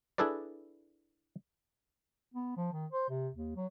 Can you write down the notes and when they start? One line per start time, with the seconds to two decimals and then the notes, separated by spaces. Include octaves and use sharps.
0.18 D4 E4 G#4 A4 B4 D5
2.34 B3
2.57 F3
2.72 D#3
2.92 C5
3.10 C3
3.35 D#2
3.56 F#3